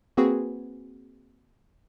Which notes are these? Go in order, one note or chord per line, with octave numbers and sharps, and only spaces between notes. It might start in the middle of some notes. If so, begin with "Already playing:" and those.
A#3 C4 F#4 G#4 B4